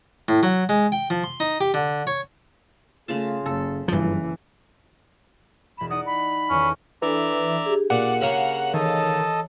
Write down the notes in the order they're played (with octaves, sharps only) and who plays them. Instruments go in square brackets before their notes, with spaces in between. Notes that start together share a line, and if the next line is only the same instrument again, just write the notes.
[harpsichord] A2
F#3
G#3
G5
F3
C6
D#4
G4
D3
C#5
[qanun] C#3 F4 A5 [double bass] A3
[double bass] F#1 [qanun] A4
[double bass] F#1 E3 [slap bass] G2 F3
[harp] E1 E7 [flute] B5
[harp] D#4 D5 F#5 [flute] D#6
[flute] B5
[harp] E2 D#3 [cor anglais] C#4
[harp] A4 A5
[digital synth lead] E3 [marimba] D4 A4 [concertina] D5 E5 A#5
[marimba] G4 G#4
[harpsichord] A#2 [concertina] D5 [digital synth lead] F#5
[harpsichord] C#3 A#3 A#5 [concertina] F5
[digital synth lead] D#3 [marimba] E3 C#5 [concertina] A4 D#5 A5